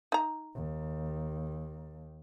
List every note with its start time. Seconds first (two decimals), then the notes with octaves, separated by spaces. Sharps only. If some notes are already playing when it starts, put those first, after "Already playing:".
0.12 D#4 A#5
0.54 D#2